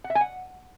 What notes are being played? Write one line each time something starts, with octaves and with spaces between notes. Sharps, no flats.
F#5
E5
G#5
F#5